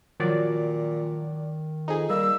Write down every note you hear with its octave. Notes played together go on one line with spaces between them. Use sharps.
A#2 D#3 F3 F#3 D5
F2 D#4 G#4
G3 A#3 E6